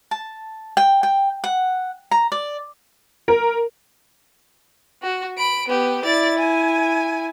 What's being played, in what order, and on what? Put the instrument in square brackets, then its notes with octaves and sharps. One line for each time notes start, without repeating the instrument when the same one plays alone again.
[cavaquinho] A5
G5
G5
F#5
A#5
D5
[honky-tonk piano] A#4
[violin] F#4
B5 D7
B3 G4
[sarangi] E4 [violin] D5 A6
[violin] G#5